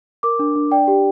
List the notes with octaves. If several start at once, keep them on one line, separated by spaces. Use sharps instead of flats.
A#4 D6
D4
D4
D5 G5
G4